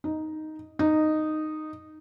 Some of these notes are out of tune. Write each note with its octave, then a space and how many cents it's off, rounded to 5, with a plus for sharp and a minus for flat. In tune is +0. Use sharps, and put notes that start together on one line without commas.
D#4 +0
D#4 -10